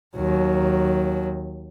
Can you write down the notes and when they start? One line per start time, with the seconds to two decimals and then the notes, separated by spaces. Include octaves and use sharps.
0.16 D#2 F#3